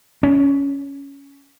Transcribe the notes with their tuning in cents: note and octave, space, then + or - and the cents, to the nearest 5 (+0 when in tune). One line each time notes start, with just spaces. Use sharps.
C#4 +10